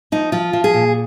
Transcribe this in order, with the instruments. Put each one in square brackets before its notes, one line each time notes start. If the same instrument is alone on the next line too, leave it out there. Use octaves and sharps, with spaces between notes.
[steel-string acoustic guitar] F3 D#4
F3 F4
F3
G#4
A#2